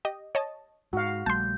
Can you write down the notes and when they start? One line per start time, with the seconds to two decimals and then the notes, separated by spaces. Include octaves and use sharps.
0.05 G4 D#5
0.35 C#5 D#5 A5
0.93 G#2 F#4 F5
1.26 A#1 G3 A3 A5 C6 G6